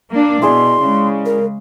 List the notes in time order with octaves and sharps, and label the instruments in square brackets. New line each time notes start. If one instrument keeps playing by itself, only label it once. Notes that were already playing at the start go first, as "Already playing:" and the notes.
[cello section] A#3 D4
[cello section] B2 [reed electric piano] E4 G#4 D5 [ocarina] C6
[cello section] C#3 G#3
[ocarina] A#4